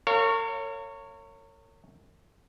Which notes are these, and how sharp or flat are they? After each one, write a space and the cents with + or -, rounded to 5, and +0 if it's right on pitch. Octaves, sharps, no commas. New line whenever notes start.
A#4 -40 C#5 +0 F5 +0